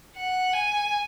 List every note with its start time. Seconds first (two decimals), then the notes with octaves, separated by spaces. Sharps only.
0.16 F#5
0.54 G#5